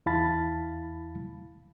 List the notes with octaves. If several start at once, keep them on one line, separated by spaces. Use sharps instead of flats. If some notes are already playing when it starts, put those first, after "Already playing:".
E2 E4 F5 A5 B5 A6